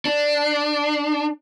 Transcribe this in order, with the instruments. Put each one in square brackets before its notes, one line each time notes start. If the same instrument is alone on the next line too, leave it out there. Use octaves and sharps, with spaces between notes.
[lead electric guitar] D4